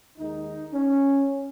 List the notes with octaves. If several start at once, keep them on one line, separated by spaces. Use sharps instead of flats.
D#2 D#3 G#3 D#4
C#4